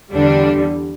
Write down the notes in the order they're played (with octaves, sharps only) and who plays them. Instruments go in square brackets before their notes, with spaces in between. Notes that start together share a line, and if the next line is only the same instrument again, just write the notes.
[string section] E2 D3 G3 D4